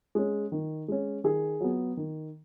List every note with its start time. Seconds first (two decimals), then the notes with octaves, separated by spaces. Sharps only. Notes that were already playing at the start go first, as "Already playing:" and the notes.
0.15 G#3 C#4
0.52 D#3
0.88 G#3 C#4
1.24 D#3 G#4
1.61 F#3 B3
1.97 D#3